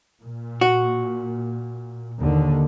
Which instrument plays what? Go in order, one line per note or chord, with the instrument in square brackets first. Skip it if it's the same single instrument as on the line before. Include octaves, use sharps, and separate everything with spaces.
[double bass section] A#2
[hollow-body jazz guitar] F#4
[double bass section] D#2 D3